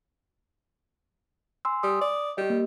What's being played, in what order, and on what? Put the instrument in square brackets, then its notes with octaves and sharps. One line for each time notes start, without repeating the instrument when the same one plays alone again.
[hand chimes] G#5 C6 E6
[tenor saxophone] G3 [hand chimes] D#6
[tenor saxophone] D5
[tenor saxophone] G3 [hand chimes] G4 D#5
[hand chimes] A#3